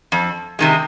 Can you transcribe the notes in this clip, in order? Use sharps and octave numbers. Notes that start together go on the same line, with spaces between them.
F2
C3 D#3 G#3